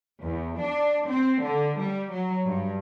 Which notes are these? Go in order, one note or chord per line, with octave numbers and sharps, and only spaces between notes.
E2
D4
C4
D3
G3
F#3
G2